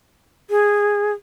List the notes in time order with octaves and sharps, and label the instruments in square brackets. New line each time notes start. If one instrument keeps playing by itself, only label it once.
[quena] G#4